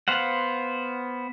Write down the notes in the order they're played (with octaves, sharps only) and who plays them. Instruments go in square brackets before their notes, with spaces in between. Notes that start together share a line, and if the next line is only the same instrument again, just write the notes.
[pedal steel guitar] B3 C5 F5 F#5